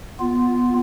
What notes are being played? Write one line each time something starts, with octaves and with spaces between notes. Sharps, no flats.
B3 F4